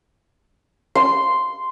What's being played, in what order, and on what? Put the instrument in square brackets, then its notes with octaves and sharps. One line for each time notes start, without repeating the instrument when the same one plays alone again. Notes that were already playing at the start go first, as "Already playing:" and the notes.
[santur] C6